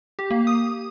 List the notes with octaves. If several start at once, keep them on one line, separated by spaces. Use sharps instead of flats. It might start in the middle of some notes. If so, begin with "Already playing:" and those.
G4
A#3
D#6